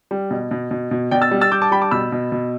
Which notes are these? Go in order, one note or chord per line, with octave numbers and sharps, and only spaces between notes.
G3
B2
B2
B2
B2
B2 D5 G5
E6 A6
G3
E6 A6
G3 D6 G6
A5 D6
G3 G5 B5
A5 D6
B2 B5 E6
B2
B2